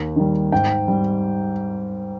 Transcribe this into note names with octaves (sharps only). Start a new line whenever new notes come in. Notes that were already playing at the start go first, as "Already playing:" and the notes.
Already playing: D#2
D#3 G3
G#2 G5
G3